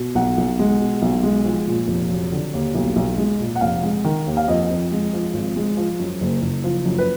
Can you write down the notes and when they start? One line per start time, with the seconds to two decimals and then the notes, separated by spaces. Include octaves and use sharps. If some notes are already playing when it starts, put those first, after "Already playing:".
Already playing: B2
0.15 B1 F#5
0.38 B1
0.59 G#3
0.80 B2
1.02 B1
1.23 G#3
1.44 F3
1.67 A#2
1.88 F1
2.11 F#3
2.32 D3
2.53 D#2
2.75 B1
2.96 B1
3.17 G#3
3.40 A#2
3.56 F#5
3.61 F1 F5
3.83 G#3
4.04 D#3
4.27 D#2
4.37 F5
4.48 F2 D#5
4.70 F2
4.92 G#3
5.13 F3
5.34 G#1
5.56 G#3
5.77 F3
5.99 F#2
6.21 F#1
6.42 F#1
6.64 F3
6.85 F#2
6.98 B4